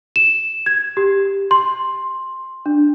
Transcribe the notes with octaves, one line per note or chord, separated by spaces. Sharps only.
E7
G#6
G4
C6
D4